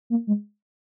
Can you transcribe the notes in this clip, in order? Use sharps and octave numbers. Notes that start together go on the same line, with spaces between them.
A#3
G#3